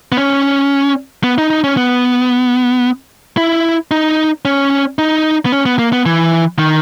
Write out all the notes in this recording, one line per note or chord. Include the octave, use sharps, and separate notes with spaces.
B3
C#4
B3
D#4
D#4
C#4
B3
E4
D#4
C#4
D#4
B3
C#4
B3
A#3
B3
E3
D#3